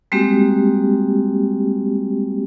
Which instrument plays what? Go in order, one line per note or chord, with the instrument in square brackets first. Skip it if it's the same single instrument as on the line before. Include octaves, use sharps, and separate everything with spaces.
[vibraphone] G3 G#3 A#3 C4 F#4 G4